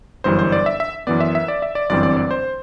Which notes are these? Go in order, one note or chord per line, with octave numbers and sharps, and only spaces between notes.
G1 F#2 E3 G3 C5
C5
D5
E5
E5
F#2 E3 B3 D5
E5
E5
D5
E5
D5
G1 F#2 E3 G3 C4 D5
D5
D5
C5